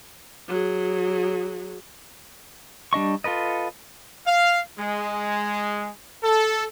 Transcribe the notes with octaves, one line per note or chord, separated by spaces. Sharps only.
F#3 G#4
G3 D4 D#5 C#6
F4 A4 B4 D#5
F5
G#3
A4